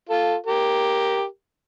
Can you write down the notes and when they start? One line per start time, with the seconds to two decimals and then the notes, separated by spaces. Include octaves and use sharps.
0.09 F4 A4
0.46 G4 A#4